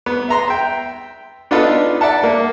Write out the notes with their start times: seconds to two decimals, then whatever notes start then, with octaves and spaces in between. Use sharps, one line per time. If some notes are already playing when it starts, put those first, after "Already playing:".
0.06 B3
0.29 E5 A#5 C6
0.48 E5 G5
1.51 B3 D4 D#4 F4 A4 B4
2.01 D5 E5 F#5 A5
2.23 A#3